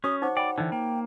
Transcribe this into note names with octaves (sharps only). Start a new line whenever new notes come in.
C#4 F#4 C#5 C#6 D#6
D#4 C5 F#5 D6
D5 G5 B5
D3 E3 D#4
A#3 G5